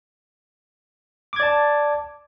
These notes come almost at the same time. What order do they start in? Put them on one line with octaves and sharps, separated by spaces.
D6 G#6 D5 A5